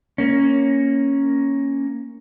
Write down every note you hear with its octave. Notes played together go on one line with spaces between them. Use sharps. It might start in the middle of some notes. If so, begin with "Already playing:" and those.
A#3 C#4